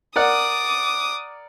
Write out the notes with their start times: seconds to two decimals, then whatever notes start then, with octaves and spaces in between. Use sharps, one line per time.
0.16 A#4 D5 F#5 D6 D#6